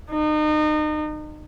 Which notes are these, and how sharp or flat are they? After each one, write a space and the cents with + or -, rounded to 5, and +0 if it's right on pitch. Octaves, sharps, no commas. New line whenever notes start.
D#4 -35